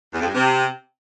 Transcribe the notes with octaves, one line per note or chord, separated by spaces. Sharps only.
E2
F2
G2
C3